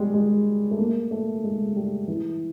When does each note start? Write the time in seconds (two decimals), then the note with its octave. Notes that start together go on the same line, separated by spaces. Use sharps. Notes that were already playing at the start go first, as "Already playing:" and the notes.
Already playing: G3 G#3
0.14 G#3
0.71 A3
0.78 A#3
1.11 A3
1.44 G#3
1.76 G3
2.08 E3